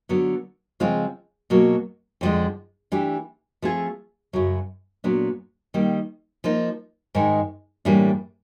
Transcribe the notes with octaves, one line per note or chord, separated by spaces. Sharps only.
D3 F#3 B3
C#3 F3 G#3 C4 F4
B2 F#3 A#3
F2 D3 F3 G#3
E3 A3 D4 G4
F3 A3 C4 F4 G#4
F#2 C#3 F#3
A#2 F#3 B3 D4
D#3 G3 A#3
F3 A#3 D#4
G#2 D#3 G#3
A2 E3 G3 A#3 D4